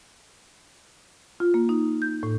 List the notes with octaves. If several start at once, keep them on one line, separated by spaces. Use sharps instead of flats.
F4
A#3
D#4
G6
A2